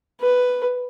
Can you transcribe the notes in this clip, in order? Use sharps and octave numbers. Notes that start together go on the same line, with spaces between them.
B4